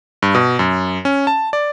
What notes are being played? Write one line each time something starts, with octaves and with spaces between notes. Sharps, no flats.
G2
B2
F#2
C#4
A5
D5